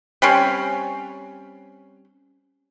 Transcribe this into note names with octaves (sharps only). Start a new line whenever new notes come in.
G3 C4 C#4